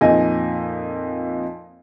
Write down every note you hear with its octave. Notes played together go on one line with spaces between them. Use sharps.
F2 A#2 D#4 D#5 G#5